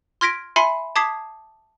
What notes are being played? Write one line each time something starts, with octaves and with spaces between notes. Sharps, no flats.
C6 F6 G#6 A#6 B6 D7
E5 G#5 B5 C6 C7 C#7
A5 D6 D#6 G#6 B6 C7